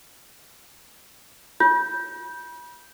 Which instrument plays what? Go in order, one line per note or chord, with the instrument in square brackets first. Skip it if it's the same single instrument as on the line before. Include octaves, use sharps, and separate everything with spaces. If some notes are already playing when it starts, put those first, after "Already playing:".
[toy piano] F4 [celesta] G6